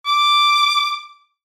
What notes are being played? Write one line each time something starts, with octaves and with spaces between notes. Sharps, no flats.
D6